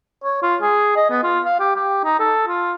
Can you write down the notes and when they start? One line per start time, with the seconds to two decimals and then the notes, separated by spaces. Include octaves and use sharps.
0.23 C#5
0.43 F4
0.61 G#4
0.96 D#5
1.10 B3
1.23 F4
1.45 F5
1.60 G4
1.75 G4
2.04 D#4
2.20 A4
2.47 F4